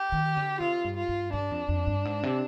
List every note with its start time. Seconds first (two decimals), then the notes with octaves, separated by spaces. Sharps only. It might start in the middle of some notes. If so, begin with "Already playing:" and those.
Already playing: G4
0.12 D#3
0.37 D3
0.60 C3 F4
0.84 G2
0.96 F4
1.09 G2
1.33 G2 D4
1.51 F2
1.69 F2
1.87 G2
2.05 G#2
2.23 C3